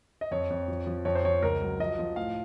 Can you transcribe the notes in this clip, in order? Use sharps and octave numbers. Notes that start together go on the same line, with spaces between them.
D#5
F2 C#5
F2
F3
F3
F2 C#5
C5
F3 C#5
C#2 A#4
F#3
F3 D#5
F3
A2 F5